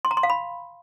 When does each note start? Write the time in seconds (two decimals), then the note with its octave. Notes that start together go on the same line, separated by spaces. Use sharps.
0.05 C6
0.11 A#5
0.17 C6
0.23 F5
0.30 B5